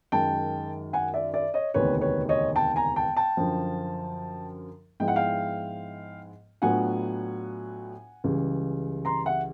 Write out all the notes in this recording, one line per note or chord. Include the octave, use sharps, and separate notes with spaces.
F#2 D#3 G#3 G5 A5
F#5 G#5
D5 E5
D5 E5
C#5 D#5
E1 D2 C3 D#3 B4 C#5
B4 C#5
C#5 D#5
G5 A5
G#5 A#5
G5 A5
G5 A5
F#2 D3 F3
G#2 F3 G#3 B3 E4 G5
F#5
F5 G5
A2 F#3 B3 D4 F4 F#5 G#5
C#2 C#3 E3 G3
A#5 C6
E5 F#5